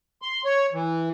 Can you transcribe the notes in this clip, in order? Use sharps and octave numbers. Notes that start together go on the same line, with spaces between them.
C6
C#5
E3